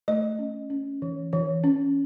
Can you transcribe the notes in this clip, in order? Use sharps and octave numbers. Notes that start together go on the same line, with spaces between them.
A3 D#5
C#4
C#4
E3
E3
C#4